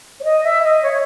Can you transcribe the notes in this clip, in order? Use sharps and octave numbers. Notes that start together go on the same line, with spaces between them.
C#5
D#5
E5
D#5
C#5